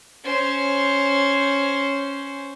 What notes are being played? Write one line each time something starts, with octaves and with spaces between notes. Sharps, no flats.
C#4 C5